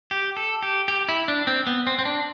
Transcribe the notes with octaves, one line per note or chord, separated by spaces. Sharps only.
G4
A4
G4
G4
E4
D4
C4
B3
C4
C4
D4